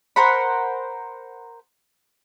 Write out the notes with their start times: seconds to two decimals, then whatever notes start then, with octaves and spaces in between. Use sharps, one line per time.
0.16 A#4 C5 F#5 B5